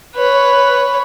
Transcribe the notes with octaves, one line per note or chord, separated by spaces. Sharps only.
B4 C#5